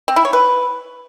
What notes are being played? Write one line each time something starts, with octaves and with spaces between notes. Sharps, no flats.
C4
E4
C#5
B4